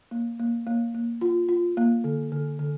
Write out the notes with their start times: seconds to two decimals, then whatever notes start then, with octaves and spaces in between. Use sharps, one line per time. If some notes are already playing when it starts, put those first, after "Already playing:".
0.11 A#3
0.39 A#3
0.67 A#3
0.95 A#3
1.21 F4
1.49 F4
1.77 A#3
2.04 D3
2.32 D3
2.59 D3